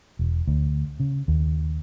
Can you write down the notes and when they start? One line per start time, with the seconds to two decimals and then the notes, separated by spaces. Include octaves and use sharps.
0.19 E1
0.47 D2
1.00 C#3
1.28 D#2